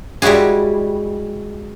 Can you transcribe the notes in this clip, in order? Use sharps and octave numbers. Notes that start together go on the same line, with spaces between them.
G3 G#3 E4 F#4 G#4